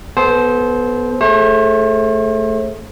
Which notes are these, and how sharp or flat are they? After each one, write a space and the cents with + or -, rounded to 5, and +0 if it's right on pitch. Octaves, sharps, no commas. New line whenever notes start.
B3 -5 A4 -35 C5 +0
A3 +0 G#4 +0 C5 +45